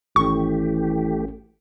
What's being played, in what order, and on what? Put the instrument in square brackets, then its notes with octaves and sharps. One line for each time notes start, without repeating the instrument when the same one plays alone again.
[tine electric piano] G#1 C#4 [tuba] E3 [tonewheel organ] A3 G4 [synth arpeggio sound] C#6